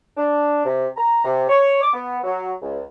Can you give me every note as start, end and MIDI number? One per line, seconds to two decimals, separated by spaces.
0.17 0.64 62
0.65 0.88 48
0.97 1.24 82
1.25 1.47 48
1.49 1.80 73
1.81 1.89 86
1.94 2.19 59
2.24 2.51 54
2.62 2.82 37